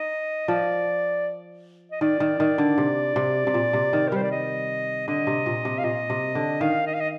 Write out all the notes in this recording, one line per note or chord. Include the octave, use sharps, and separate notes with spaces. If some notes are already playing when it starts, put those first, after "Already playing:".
Already playing: D#4 D#5
F3 D5
D#5
D#3 D5
D#3
D#3
D3
C3
C3
C3
A#2
C3
D#3
A#4
G3 C5
D5
D#5
D3 D#5
C3
A#2
C3
F5
A#2 D#5
C3
D3
D#3 F5
D#5
F5
D#5